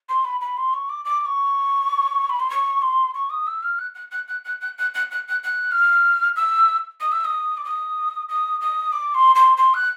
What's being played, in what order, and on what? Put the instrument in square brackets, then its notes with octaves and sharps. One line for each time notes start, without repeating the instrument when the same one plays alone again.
[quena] C6
B5
B5
C6
C#6
D6
D6
D6
C#6
B5
C6
C#6
C6
C#6
D#6
E6
F6
F#6
F#6
F#6
F#6
F#6
F#6
F#6
F#6
F#6
F#6
F#6
F6
E6
D#6
E6
D#6
D6
D#6
D#6
D#6
D6
C6
C6
C6
F#6